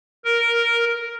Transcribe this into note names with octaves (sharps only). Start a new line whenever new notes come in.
A#4